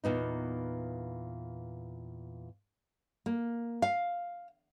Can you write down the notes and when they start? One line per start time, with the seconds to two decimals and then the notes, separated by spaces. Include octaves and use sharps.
0.04 E2 A#2 B3 D#4
3.26 A#3
3.82 F5